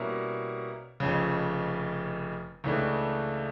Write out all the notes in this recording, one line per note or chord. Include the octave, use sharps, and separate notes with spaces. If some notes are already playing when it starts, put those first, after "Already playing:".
Already playing: B2 G3 A#3 C#4 E4
F1 F2 C#3
C#2 C#3 E3 A3 D4